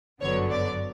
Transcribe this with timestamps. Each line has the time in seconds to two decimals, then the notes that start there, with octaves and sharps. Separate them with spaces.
0.21 G1 F#2 D3 F#3 B3 C#5
0.51 D5